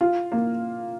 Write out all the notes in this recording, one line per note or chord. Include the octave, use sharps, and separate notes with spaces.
F4
A#3